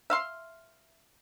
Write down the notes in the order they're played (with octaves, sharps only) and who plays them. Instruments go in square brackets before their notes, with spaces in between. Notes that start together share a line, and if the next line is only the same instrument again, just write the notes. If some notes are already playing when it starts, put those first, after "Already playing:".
[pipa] E5 F5 C6